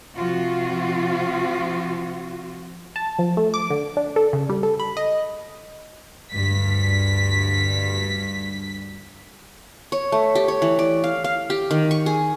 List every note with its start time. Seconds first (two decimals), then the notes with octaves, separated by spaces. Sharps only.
0.16 C3 F3 F4 F#4
2.96 A5
3.19 F3
3.37 A3
3.54 D6
3.70 D3
3.97 D4
4.16 A4
4.33 C#3
4.49 G3
4.63 A4
4.80 B5
4.97 D#5
6.33 D2 G2 B6
9.92 C#5
10.12 A3
10.35 G4
10.48 C#5
10.62 E3
10.79 D5
11.04 F5
11.24 F5
11.50 G4
11.71 D#3
11.91 C#6
12.06 G#4